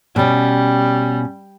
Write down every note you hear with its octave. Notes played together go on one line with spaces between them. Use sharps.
B2 G3 C#4